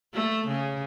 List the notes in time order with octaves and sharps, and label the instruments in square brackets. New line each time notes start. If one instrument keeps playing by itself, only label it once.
[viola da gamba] A3
C#3